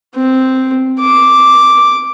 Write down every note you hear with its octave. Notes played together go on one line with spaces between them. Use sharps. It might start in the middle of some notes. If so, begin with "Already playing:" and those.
C4
D6